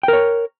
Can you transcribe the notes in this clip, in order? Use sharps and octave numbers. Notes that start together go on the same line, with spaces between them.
A#4 C#5 G5